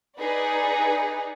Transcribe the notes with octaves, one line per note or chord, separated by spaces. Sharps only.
D#4 G#4 B4 D5